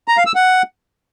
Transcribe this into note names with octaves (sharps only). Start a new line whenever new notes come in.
A#5
F5
E6
F#5